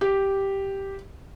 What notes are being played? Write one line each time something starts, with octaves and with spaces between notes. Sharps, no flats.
G4